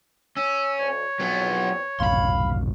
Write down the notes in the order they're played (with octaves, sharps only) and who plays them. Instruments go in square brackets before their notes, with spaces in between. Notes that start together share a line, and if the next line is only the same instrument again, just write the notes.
[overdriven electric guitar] C#4 [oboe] E6
[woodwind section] D2 [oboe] C#5
[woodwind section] E2 F3 C4 [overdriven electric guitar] F#3 B3
[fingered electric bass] F1 B1 [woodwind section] F5 [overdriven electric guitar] B5 C6